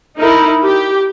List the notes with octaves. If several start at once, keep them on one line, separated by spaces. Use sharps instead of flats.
D#4 E4 A#4
G4